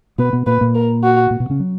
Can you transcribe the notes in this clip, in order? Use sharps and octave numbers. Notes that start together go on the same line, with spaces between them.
B2 B3 B4
B2 B3
A#2 A#3 B4
A#2 A#3
A#4
F#4
A#2 A#3
B2 B3
C#3 C#4
F#3